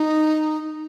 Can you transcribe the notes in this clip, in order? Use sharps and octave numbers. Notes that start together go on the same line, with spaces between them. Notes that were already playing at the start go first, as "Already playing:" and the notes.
Already playing: D#4